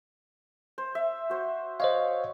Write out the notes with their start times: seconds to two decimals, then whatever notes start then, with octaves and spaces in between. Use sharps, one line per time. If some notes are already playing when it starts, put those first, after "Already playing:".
0.78 C5
0.95 E5
1.30 F#4 C5
1.80 C5 C#5 D#5 F5